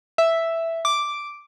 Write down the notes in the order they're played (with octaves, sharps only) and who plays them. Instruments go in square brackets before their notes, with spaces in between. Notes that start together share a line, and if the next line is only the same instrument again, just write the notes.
[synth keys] E5
D6